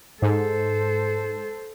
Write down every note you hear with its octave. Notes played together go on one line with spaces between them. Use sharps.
G#2 A4 C5